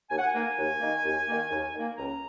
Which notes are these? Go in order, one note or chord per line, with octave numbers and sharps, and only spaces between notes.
D#2 G#5
F#5
G#5
D#3 A#3
D#2
D#3 A#3
D#2
D#3 A#3
D#2
D#3 A#3
C#2 A#5